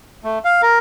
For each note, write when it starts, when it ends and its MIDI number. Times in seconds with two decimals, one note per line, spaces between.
0.24 0.39 57
0.45 0.61 77
0.63 0.79 70